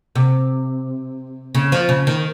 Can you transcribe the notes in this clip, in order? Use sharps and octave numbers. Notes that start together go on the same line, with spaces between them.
C3
C#3
F3
C#3
D#3